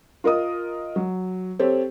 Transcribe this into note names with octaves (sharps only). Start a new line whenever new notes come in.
F4 A#4 D#5 D#6
F#3
C4 G4 A4 C#5